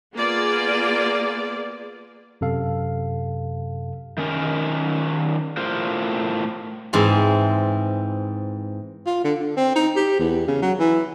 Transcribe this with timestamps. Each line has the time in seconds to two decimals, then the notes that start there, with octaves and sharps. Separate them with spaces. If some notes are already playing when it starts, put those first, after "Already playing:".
0.14 A#3 B3 F4 G#4 D5
2.41 F#2 C3 A4 F5
4.18 D#3 C#4 A#4
5.57 A2 F4 A#4 C5
6.93 G#2 E3 C4 E4
9.06 F4
9.24 D3
9.39 D3
9.57 C4
9.75 D#4
9.96 G4
10.19 E2
10.47 C#3
10.62 F#3
10.79 E3